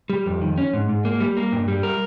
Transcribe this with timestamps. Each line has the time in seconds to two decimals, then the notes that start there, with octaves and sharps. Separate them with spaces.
0.10 G3
0.26 F2
0.41 D#3
0.58 C#4
0.73 G#2
0.89 G#2
1.05 A#3
1.20 G3
1.37 A#3
1.52 G2
1.68 G3
1.83 A#4